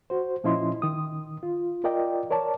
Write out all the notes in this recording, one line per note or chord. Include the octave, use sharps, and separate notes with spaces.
F#4 C5
A#2 F3 C#4 E4 D#5 C6
D#3 D#6
F4
F4 A#4 D5 D#5 G5
A#4 C#5 D5 A5